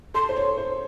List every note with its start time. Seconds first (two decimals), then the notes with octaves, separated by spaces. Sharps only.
0.14 A4 C6
0.29 C5
0.36 C#5
0.57 C5